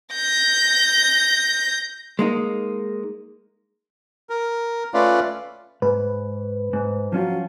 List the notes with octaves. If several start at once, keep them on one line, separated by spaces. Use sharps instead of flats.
G6 A#6
G#3 A#3 D#4
A#4
A3 C#4 F4 B4 D5 F5
G#2 B4
G#2
F3 F#3 C#4 F4